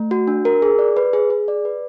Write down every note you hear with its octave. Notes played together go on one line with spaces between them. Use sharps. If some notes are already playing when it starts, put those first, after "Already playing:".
Already playing: A3
F#4
D4
A#4
G#4
D5
B4
G#4
G#4
D5
B4